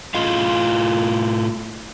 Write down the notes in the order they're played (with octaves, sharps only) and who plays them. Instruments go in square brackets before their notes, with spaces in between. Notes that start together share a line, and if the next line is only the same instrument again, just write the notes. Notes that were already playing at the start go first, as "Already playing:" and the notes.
[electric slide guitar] A2 F4 D#5 F5